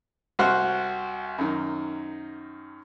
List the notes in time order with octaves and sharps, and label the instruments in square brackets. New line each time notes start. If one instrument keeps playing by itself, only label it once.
[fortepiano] C2 F#4 C5 F#5 C6 F6
F#2 D#3